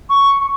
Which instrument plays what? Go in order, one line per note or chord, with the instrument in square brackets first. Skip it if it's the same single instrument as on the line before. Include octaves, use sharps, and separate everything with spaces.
[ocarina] C#6